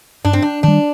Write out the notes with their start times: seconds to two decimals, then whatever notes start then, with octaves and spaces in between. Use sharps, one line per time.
0.25 G2 D4
0.33 C4
0.42 D4
0.63 D#3 G3 D4